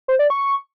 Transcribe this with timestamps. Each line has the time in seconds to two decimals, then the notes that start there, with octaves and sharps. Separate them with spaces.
0.08 C5
0.19 D5
0.30 C#6